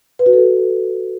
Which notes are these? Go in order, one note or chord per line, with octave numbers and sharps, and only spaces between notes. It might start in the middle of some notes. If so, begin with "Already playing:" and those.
B4
F#4
A4